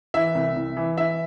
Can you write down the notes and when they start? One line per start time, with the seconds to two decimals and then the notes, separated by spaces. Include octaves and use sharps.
0.14 E3 E5
0.35 C2
0.56 C2
0.77 E3
0.97 E3 E5